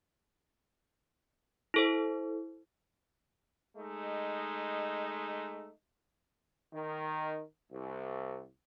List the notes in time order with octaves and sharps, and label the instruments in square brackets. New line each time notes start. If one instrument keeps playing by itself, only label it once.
[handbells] E4 A4 C5
[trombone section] G#3 A3 D#4
D#3
C2